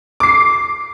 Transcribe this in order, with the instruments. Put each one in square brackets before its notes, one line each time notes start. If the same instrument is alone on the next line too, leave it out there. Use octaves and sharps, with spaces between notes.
[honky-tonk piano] D6 C7